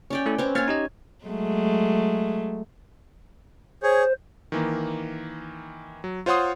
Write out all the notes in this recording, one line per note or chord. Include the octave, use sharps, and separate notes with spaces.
C#4 D5 G5
A3 E4 A4
C4 C#4 B4
A#3 C#5 G#5 F6 A6
D#4 G4 D#5
F#3 G#3 A3
G#4 C5 C#5
D#3 E3 A#3
F#3
F4 C5 C#5 F#5 C6 D#6